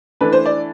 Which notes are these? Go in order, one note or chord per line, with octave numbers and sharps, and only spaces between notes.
E3 A3 D4 B4
C5
D5